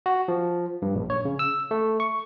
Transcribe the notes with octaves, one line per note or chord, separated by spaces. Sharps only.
F#4
F3
G2
A#1
C#5
C#3
E6
A3
C#6